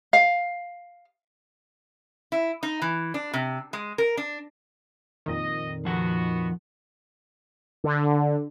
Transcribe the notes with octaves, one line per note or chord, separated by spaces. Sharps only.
F5
E4
D#4
E3
D4
C3
G#3
A#4
D4
F2 A#2 D#3 D#5
F3 B3 F#4 F#5
D3